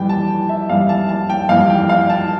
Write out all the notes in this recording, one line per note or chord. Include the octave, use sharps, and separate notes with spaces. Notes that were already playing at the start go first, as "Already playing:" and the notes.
Already playing: F2 E3 G3 G5
A5
E5
F2 E3 G3 F5
A5
A5
G5
F2 E3 G3 F5
G5
F5
A5